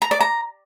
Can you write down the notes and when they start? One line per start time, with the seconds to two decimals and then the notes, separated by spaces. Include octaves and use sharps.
0.02 A#5
0.11 D5
0.21 A#5